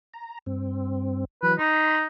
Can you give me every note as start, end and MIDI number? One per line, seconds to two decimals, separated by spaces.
0.13 0.38 82
0.46 1.25 43
0.46 1.25 60
1.43 1.59 52
1.43 1.59 54
1.43 1.53 71
1.59 2.07 63
1.59 1.99 83
1.59 1.99 84